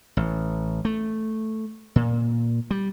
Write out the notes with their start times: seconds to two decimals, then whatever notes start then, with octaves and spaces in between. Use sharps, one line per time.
0.17 A1
0.85 A3
1.96 A#2
2.71 G3